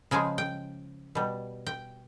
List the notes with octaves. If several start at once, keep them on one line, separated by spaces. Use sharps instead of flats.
C#3 F3 G#3 G#5
G5
B2 G3
G5